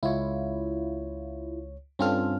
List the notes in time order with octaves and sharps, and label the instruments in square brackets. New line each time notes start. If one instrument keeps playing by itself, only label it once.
[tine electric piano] C#2 C#5 [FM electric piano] E4 F4
[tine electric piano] G2 C4 F6 [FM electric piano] C#4 F4 A4